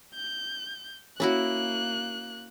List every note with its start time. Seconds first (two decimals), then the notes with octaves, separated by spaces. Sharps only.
0.14 G6
1.20 A#3 C#4 E4 F#4 F#6